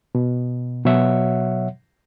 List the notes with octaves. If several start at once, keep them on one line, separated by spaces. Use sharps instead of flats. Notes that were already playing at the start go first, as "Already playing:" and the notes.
B2
B2 F#3 C#5 E5 F#5